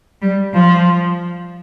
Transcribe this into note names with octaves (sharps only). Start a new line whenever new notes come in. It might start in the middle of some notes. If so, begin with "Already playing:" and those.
G3
F3